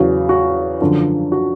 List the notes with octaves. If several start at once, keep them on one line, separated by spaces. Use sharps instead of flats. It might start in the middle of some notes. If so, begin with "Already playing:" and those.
Already playing: E2 C#3 F#3 F#4
F#4
F#2 D3 F3
F#4